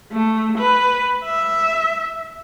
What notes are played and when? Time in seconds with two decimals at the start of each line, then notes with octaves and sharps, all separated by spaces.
0.13 A3
0.58 B4
1.24 E5